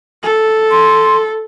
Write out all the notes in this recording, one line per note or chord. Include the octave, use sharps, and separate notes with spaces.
A4
C6